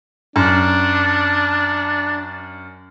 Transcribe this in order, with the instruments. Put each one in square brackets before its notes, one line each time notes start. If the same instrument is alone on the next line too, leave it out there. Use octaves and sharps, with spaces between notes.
[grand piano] F#2 [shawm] D4